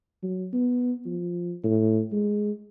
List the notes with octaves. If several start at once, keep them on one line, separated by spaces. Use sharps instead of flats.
F#3
B3
F3
A2
G#3